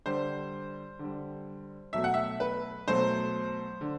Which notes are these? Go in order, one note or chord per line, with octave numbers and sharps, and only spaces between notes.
D3 G3 C5
D3 G3
B2 F#3 A3 E5
F#5
E5
B4
B2 F#3 A3 C5
D3